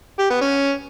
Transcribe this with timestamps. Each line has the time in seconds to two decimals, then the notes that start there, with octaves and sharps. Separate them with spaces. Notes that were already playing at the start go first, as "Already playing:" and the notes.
0.19 G4
0.30 B3
0.41 C#4